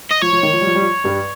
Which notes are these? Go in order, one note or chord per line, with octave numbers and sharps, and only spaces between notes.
D#5
F3 C#5
F3
D#3
F3
G3
F3
G3
F3
G2 G3